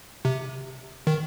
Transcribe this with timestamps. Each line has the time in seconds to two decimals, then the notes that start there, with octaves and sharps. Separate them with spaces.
0.25 C3
1.07 D#3